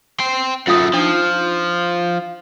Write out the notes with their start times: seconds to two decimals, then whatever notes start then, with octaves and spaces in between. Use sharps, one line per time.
0.20 G5 C6
0.67 F#2 A3 F4 F5 D#6
0.94 F3 D4 D#4